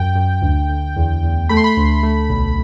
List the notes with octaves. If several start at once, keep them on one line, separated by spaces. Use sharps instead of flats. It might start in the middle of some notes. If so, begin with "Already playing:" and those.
Already playing: F#2 G5
F#2
D2
D2
E2
E2
A3 B5
C6
B5
D2
A3
B1